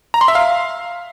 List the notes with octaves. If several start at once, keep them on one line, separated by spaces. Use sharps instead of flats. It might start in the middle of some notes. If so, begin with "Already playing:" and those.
A#5
C6
E5
F5